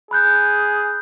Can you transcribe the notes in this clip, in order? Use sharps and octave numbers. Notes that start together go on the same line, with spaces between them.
G#4 B5 F#6 G6